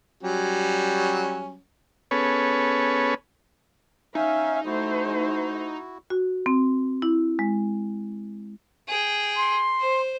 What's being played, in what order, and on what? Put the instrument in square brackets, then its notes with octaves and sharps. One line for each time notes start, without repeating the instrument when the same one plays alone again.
[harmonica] F#3 G3 C#4
[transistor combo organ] B3 C#4 G#4 A4 B4 C#5
[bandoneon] C#4 F5 G#5 [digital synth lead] D#4 [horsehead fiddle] E5
[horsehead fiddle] A3 C5 [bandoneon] E4 F#4
[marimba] F#4
C4
E4
G#3
[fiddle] G#4 G5
[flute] C6
[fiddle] C5